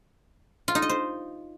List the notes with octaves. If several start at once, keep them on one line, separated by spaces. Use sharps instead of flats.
F4
D#4
D#5
C5